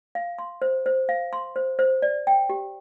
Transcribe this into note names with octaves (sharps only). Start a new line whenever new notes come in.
F5
C6
C5
C5
F5
C6
C5
C5
D5
G5
G4